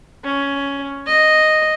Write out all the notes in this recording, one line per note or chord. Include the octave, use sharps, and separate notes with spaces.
C#4
D#5